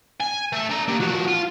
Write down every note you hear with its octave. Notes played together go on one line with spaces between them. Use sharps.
G#5
A3 E5
D4 A#5
A#3 G4
F3 F#4
F4